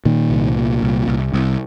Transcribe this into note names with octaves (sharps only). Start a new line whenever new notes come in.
A#2 D#3
C2
A#2
C2
C2
C2